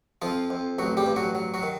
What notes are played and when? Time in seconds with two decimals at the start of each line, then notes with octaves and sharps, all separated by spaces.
0.22 F2 F3 F4
0.50 F2
0.79 A1 F#3 F#4
0.97 G3 G4
1.07 G2
1.16 F#3 F#4
1.35 F#3
1.54 F#3 F#4
1.63 D#3